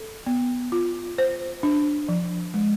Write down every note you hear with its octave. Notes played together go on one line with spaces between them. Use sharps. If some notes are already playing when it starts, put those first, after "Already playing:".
Already playing: A4
B3
F4
C5
D4
F3
G#3